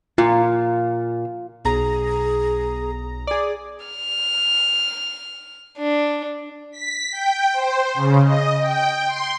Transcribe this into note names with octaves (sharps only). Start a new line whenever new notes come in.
A#2 F4
B1 G#4 A#5
G#4 D5
F6
D4
B6
G5
C5
C#3
D#5
G5
C6